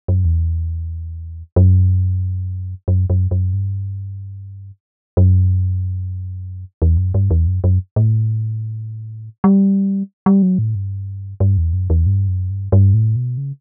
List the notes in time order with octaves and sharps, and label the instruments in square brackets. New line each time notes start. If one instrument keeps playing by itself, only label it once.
[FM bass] F#2
E2
F#2
F#2
F#2
F#2
G2
F#2
E2
F#2
G2
E2
F#2
F#2
A2
G3
G3
F#3
A2
G2
G2
E2
F#2
E2
G2
F#2
G2
G2
A2
B2
C#3